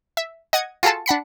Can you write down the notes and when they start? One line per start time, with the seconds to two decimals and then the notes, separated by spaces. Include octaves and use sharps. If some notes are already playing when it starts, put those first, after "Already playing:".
0.17 E5
0.53 D#5 F#5 D#6 G#6
0.83 F4 F#4 G#4 A4 A5
1.06 D4 F#5 B5 C#7